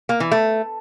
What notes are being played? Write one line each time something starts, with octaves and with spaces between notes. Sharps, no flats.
A#3
E3
A3